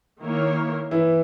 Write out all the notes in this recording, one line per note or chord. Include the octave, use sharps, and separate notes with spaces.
D#3 A#3 E4 A#4 C#5
E3 E4